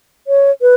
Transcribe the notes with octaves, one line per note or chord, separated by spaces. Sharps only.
C#5
B4